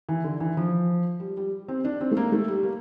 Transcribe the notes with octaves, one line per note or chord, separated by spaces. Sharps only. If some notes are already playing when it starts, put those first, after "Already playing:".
E3
D3
E3
F3
G3
G3
C4
D4
C4
A3
A#3
A3
G3
A#3